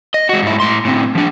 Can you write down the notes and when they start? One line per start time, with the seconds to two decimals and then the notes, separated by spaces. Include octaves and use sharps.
0.14 D#5
0.29 G#3 F#4
0.42 G#2 E4
0.60 A2 C6
0.85 A2 C4
1.15 F3 D4